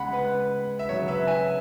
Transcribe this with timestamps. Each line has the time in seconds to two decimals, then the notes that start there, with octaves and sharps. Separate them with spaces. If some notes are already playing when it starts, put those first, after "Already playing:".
Already playing: C#3 G#3 F#5 B5
0.13 B4
0.79 E5
0.89 C#3 F#3 C#5
1.08 B4 E5
1.27 E5 G#5